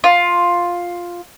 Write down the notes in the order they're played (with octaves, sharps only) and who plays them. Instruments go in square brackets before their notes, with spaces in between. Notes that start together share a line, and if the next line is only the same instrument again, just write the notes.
[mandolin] F4